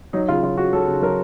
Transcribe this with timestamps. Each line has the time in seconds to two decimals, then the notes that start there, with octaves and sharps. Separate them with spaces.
0.13 F#3 D#4
0.28 C#3 F4
0.43 F#3 F4
0.57 C#3 F#4
0.73 F#3 A4
0.88 C#3
1.02 F#3 A#4